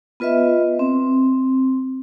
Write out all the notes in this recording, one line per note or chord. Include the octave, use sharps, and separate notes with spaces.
B3 F4 B4 D#5 E5
C4